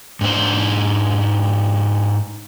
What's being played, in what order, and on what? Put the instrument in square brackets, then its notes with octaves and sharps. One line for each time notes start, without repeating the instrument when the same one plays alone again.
[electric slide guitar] G#2 D4 C5